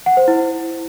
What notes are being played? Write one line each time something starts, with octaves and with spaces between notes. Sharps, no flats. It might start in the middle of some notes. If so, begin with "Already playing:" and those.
F#5
C5
E4